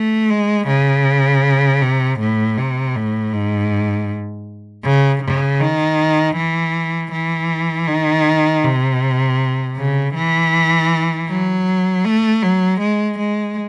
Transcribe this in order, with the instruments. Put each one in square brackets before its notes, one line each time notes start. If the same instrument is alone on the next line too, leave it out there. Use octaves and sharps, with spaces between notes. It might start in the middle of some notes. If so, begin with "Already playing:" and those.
Already playing: [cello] A3
G#3
C#3
C3
A2
C3
A2
G#2
C#3
C#3
D#3
E3
E3
D#3
C3
C#3
E3
F#3
A3
F#3
G#3
G#3